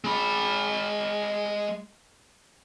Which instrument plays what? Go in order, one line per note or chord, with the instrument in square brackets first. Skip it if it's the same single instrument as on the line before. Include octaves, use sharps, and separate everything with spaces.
[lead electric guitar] G#3 B5